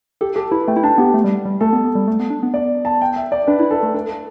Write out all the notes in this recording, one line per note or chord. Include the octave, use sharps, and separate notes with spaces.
G4 A4
G4 A4
E4 B4
A3 G5
E4
D4 A5
B3 G4
A3
G3
G3
A3 A4
B3
B3
G3
A3
B3
D4
B3
D5
A5
G5
E5
D5
D4 B4
E4
A4
A3
D4 A4